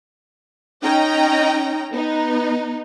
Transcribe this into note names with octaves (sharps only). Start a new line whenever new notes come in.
C#4 D#4 D#5 G5 A#5
B3 D#4